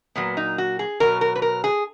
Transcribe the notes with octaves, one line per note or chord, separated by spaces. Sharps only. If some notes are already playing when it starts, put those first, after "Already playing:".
A#2 F#3 B3
D#4
F#4
G#4
B2 F#3 A#4
A#4
B4
A#4
G#4